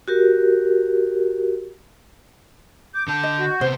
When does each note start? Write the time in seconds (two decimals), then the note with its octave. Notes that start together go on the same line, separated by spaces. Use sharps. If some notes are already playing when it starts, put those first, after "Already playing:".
0.08 F#4 G4 A#4
2.95 D6 G6
3.08 D3 A5 G6
3.23 D#5
3.39 F#4
3.61 C3 B3 C5